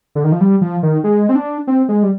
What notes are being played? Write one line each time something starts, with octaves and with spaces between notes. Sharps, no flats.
D3
D#3
F3
G3
F3
D#3
G#3
C4
D4
C4
G#3
G3